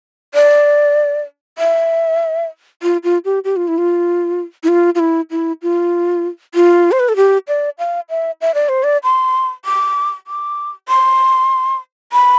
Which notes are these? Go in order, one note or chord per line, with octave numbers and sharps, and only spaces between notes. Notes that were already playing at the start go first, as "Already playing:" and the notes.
D5
E5
F4
F4
G4
G4
F4
E4
F4
E4
F4
F4
E4
E4
F4
F4
C5
B4
A4
G4
D5
F5
E5
E5
D5
C5
D5
C6
D6
D6
C6
B5